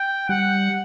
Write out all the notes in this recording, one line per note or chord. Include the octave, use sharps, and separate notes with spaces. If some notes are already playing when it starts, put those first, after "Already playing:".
Already playing: G5
G3 F#5